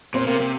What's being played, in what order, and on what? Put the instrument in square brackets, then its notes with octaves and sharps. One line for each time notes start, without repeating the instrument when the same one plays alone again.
[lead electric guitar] A#2 [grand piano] C4 C5
[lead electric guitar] C3 [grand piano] A#3 A#4
[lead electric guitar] C3